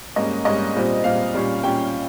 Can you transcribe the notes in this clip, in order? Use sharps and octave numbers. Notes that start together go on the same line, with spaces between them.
G#2 G3 A#3 C#4 D#5
G#2 G3 A#3 C#4 D#5
A#2 G3 C4
A#2 G3 C4 F5
A#2 G3 C#4
A#2 G3 C#4 G5